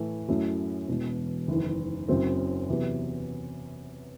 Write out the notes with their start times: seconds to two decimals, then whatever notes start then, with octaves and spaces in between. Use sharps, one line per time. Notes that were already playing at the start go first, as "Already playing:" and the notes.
Already playing: A2 E3 A3 E4
0.28 F#2 F#3 A3 E4
0.88 E1 E2 B2
1.48 F#1 E2 D#3
2.09 F#1 F#2 F#3 C4
2.69 E2 C3 F#3 B3